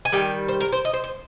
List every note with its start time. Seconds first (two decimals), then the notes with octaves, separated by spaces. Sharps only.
0.05 G#5
0.12 D#3 G3 G5
0.48 C5
0.60 A#4
0.72 C5
0.85 D#5
0.93 C5
1.04 C5